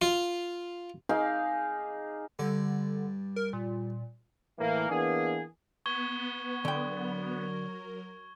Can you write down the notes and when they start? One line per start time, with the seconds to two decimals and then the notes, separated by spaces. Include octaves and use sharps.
0.02 F4
1.09 D#4 G#4 F5 D6
2.39 G2 D3 D5
3.36 A#4
3.53 A#2
4.58 A2 E3 A#3
4.89 E3 A#3 B3 D4 G#4
5.86 B3 C#6 G#6 G7
6.65 D3 F#3 A#4 G5